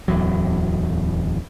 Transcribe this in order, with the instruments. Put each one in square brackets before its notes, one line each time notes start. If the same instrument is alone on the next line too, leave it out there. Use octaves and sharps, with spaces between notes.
[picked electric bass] D1 E2 F#3